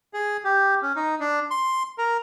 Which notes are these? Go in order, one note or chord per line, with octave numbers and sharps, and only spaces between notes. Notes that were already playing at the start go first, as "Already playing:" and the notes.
G#4
G4
C#4
D#4
D4
C6
A#4